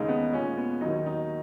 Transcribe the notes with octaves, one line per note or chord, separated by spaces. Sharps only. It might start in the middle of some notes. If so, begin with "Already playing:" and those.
Already playing: D#2 C#3 G#3 D#4
B3
A#2 G#3 C#4
B3
D#2 D#3 F#3 D#4
D#4